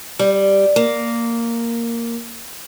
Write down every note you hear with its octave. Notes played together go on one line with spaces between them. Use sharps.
G3
A#3